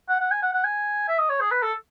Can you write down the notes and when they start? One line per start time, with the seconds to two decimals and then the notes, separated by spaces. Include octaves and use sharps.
0.09 F#5
0.20 F#5
0.31 G#5
0.42 F#5
0.53 F#5
0.64 G#5
1.08 E5
1.19 D#5
1.30 C#5
1.41 G#4
1.51 B4
1.62 A4